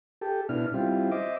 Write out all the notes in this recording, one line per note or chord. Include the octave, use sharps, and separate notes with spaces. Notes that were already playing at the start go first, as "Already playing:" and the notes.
G4 A4
B2 D4 E4 F6
G3 C4 E4 F4
C5 D#5 E5 D6